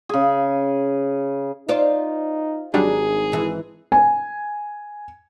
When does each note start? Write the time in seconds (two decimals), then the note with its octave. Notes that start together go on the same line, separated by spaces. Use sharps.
0.09 C#3 G#4
1.69 D#4 F4 C5 D5
2.74 G#1 F#3 G3 D4 D#4 G#4
3.32 G#2 E3
3.92 G#5